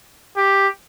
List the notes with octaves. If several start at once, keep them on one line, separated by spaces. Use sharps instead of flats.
G4